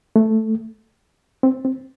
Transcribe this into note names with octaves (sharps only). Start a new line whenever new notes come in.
A3
C4
C4